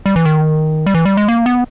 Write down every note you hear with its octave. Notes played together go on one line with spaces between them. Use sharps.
G3
E3
D#3
G3
E3
G3
G#3
A#3
B3